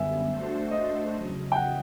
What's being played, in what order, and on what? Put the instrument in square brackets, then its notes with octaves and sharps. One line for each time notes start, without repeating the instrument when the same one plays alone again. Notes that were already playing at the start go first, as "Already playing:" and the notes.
Already playing: [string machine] F#2 D3 G3 B3 [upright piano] E5 G#5
[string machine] A3 D4 F#4 A4 C5
[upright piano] D#5
[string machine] E2 C#3 F#3
[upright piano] G5
F#5